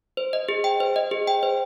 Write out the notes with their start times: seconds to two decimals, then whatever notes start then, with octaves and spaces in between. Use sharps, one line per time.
0.17 C5
0.33 D#5
0.49 G#4
0.64 G5
0.80 C5
0.96 D#5
1.11 G#4
1.27 G5
1.43 C5